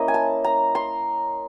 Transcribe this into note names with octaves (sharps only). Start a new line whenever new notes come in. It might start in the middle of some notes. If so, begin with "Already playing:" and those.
Already playing: A#3 C#4 E4 D#5
G#5
A5
A#5
C6